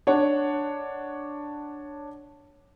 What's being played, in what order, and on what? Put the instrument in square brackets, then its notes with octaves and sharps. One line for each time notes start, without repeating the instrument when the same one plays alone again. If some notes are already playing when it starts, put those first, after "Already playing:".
[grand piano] D4 C#5 F#5